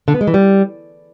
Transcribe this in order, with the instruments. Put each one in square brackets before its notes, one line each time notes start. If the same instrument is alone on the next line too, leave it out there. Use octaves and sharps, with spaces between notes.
[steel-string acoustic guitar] D3
B3
G#3
E3
G3